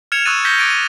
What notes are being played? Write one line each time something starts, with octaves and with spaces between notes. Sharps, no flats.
F6 G#6 C#7 E7 F7
C#6 D#6 E6 F#6 A6 D#7
F6 G6 A#6 B6 G7
D6 A6 D7 D#7
D#7